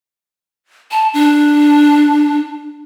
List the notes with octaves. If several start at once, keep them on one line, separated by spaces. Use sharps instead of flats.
A5
D4